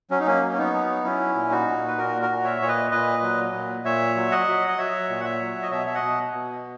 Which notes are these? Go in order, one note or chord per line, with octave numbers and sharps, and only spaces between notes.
F#3 C#4
D#4
A#3 C#4
F#3
C#4
B3 D#4
F#3
F#3 C#4 E4
A#2
D#4 F#4
A#2
B4
A#2 F#4 A#4
F#4 A#4
A#2
C#5 E5
A#2 C#5
B4 D#5
A#2 B4 D#5
F#3
A#2
A#2 C#5 E5
F#3
D#5 F#5
F#3
D#5
F#3 C#5 E5
A#2
F#5
C#5 E5
F#3
D#5
B2 C#5 E5
E5
D#5 F#5
B2
B2